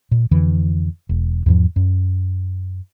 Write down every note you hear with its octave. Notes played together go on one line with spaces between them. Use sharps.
A#2
F2 D3 E3
E1
E2 G#2 F3
F#2